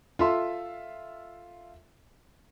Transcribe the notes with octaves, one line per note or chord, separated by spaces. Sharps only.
F4 A4 E5 C6